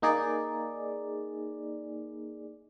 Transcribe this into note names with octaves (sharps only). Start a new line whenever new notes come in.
A#3 D#4 G#4 D5